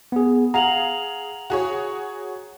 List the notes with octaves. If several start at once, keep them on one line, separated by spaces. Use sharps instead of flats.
B3 G#4
G#4 F5 F#5 A#5 F7 F#7
F#4 G#4 C#5